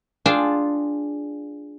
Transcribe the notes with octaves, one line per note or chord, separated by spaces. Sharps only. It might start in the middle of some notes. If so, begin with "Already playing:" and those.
D4 F4 G#4 G5 A5